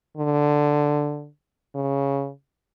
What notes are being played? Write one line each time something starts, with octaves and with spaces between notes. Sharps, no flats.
D3
C#3